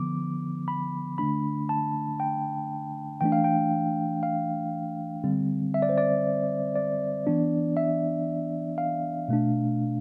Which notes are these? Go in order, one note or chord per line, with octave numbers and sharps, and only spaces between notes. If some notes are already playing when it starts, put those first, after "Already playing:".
Already playing: D3 F3 B3 D6
B5
D3 A3 D4 B5
A5
G5
E3 A3 D4 G5
F5
G5
F5
D3 G3 C4
E5
D5
C5
D5
D5
E3 B3 D4
E5
F5
B2 A3 D4